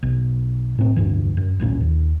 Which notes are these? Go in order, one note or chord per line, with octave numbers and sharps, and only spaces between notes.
B1
A2 C4
F1 D2 G2 E3
F#2
D1 A1 A#2 C#4
D#2